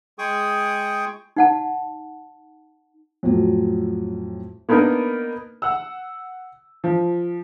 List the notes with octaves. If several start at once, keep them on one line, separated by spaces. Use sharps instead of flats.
G#3 G#4 G5 C#6 D#6
D#4 F#5 A5
F2 A2 F#3
A#3 B3 D4 D#4 A#4
F#5 E6
F3